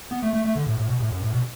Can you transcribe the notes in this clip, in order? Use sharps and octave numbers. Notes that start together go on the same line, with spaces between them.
B3
A3
A3
A3
D3
A2
A2
B2
A2
F#2
A2
B2